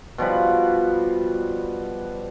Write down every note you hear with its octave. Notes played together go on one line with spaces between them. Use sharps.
B2 F3 G3 B4